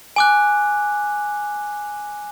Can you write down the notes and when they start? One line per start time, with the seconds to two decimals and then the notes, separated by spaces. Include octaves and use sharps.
0.16 G#5 D6 F#6